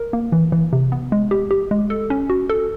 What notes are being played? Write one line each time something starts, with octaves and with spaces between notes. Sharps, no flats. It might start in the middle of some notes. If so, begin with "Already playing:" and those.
Already playing: A#4
A#3
E3
E3
C3
B3
G#3
G4
G4
G#3
A4
C#4
F#4
A4